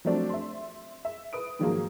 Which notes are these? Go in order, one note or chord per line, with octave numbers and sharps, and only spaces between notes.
F3 F#3 A3 C4 D4
E5 C6
E5
B4 D#6 D7
G#2 D#3 F3 F#3 G#3 A#3